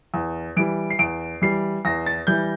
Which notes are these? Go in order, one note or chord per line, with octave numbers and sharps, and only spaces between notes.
E2
E3 G3 D7
C7
E2 D7
E3 G3 C7
E2 A#6
A6
E3 G3 G6